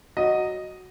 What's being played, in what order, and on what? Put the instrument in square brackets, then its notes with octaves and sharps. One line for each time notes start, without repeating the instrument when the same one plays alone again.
[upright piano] F#3 D#5